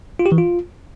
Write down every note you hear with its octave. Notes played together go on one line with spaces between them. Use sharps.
F4
G4
E3
F4